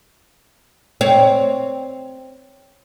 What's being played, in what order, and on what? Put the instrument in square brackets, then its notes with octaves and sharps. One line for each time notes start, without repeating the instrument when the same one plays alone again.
[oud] C4 C#5